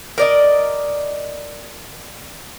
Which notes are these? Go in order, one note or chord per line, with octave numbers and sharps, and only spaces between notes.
A#4 D5 D#5